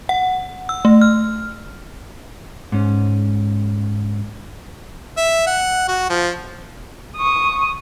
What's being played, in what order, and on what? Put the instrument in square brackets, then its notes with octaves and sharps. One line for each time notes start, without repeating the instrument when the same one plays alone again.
[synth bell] F#5
E6
A3
F6
[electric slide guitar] G#2 C#4
[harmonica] E5
F#5
F#4
F3
[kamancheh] C#6 D#6